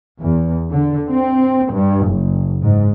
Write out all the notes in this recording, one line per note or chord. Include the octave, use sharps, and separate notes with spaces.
E2
D3
C4
G2
F#1
G#2